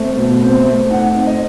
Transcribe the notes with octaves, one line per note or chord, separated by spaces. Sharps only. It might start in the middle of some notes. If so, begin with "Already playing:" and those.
Already playing: A3 C4
B2
C4
A3
D#4 F#5
C4
D#5